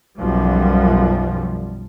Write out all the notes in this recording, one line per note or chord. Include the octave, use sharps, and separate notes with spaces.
B1 F#2 F3 G3